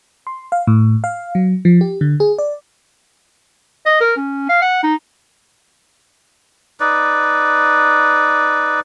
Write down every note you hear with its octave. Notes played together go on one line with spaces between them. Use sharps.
C6
F5
A2
F5
F#3
F3
G4
D3
G#4
D5
D#5
A#4
C#4
F5
F#5
D#4
D#4 B4 D5